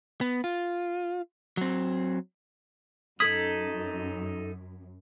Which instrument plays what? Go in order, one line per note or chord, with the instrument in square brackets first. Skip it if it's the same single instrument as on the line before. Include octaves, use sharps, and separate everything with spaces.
[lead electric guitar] B3
F4
F#3 C4
[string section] F#2 [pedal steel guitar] D#4 A4 D#6 [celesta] G#6 B6 F#7